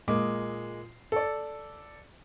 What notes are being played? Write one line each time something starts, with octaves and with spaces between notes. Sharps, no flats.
A#2 G#3 A#3 D6
A4 D5